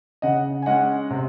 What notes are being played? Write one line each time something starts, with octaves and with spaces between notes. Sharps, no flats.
C#3 D#5 F#5
G#5
G#3 C#4 D#5 F#5
C3